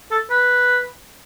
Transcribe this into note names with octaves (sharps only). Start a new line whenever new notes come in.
A4
B4